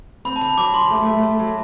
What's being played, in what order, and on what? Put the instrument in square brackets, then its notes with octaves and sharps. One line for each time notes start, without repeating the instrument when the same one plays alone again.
[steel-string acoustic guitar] C4 [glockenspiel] B5
[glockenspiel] A5
[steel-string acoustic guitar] D3 [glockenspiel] B5
[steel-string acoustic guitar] F#3 [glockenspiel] D6
[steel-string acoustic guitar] G4 [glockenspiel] C6
[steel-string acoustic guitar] A3
A3
A3
F#3